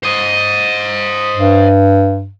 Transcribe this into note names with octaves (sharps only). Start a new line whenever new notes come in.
C5 D#5
G2